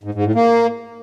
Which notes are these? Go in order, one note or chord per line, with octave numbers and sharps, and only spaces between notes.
G#2
G#2
A2
A#3